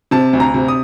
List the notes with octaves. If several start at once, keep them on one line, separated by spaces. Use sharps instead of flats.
C3 A5
D2
A#5
C3
D#6